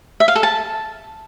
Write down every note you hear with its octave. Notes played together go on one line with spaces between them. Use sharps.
E5
F5
A4
A5